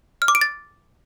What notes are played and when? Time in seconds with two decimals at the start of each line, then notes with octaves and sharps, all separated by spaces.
0.22 F6
0.28 D6
0.35 D7
0.41 A6